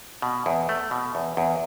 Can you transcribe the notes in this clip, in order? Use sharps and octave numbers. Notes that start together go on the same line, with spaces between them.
B2
E2
A3
B2
E2
E2